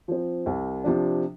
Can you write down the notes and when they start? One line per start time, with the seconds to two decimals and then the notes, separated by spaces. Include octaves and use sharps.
0.08 F3 C4
0.46 C2
0.84 C3 F3 D4